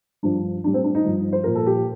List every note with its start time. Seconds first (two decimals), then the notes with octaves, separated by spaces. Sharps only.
0.23 G2 F3 D4
0.64 A2 G3 D4
0.74 C4
0.84 D4
0.95 D#4
1.05 G2 F3
1.33 C5
1.44 A#2 F3 A#4
1.55 A4
1.67 G4